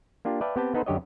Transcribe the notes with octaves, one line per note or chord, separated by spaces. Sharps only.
A#3 D4 F4 G4
B4 D5 E5 F5 G5 A5
B3 C4 G4 B4 G5 A5
B3 D#4 A4 B4 C5
F#2 D3 G4 C#5 D#5